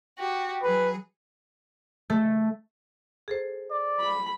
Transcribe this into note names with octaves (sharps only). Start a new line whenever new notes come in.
F#4 G4
F#3 G#4 B4
A3
G#4 A4 C5
D5
B5